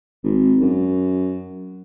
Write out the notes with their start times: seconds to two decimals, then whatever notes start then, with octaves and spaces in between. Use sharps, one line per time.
0.24 G#1
0.61 F#2